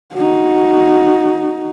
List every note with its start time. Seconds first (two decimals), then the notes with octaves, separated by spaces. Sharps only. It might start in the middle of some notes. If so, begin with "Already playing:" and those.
0.14 D#4 F#4